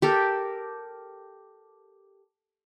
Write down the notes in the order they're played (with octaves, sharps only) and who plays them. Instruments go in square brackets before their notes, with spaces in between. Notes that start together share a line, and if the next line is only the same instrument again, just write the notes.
[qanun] G4 A4 A#4